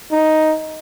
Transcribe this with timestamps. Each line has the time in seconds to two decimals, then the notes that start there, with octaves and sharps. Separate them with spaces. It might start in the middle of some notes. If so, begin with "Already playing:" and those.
0.12 D#4